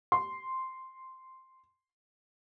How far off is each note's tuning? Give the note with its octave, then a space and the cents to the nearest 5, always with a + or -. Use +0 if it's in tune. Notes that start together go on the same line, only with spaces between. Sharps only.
C6 -5